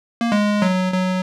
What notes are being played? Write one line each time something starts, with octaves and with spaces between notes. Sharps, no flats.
A#3
G#3
F#3
F#3